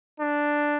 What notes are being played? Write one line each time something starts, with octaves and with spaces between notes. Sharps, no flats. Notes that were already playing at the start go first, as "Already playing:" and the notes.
D4